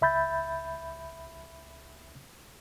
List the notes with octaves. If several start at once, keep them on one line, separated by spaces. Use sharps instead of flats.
C#2 E5 B5 G6 A6